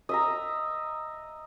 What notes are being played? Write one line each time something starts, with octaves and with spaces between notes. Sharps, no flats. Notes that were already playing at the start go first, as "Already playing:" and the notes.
D#5 E5 A#5